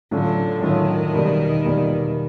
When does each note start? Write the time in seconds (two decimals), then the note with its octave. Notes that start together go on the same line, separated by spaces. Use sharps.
0.11 A2 D3 F#3 A3 C#4 F4
0.62 A2 D#3 F#3 A3 C#4 F4
1.14 E2 B2 G3 A#3
1.65 E2 B2 G3 A#3